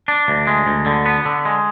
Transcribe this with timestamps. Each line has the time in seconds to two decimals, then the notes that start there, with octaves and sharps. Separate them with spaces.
0.08 D4
0.28 D2
0.47 G#3
0.67 D2
0.86 D3
1.06 B3
1.26 D3
1.45 G#3